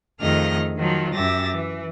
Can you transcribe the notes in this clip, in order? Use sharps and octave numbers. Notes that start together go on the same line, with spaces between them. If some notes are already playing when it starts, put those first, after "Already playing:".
F2 D#3 A3 G#4 D#5 F6
D#3 F3 F#3
F#2 G4 E5 A6 A#6
E3